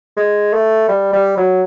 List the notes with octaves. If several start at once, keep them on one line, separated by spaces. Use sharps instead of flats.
G#3
A3
G3
G3
F#3